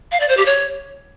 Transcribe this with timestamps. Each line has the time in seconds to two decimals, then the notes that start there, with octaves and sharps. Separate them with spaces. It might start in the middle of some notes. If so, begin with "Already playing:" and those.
0.12 F5
0.20 D5
0.29 C5
0.37 G4
0.46 C#5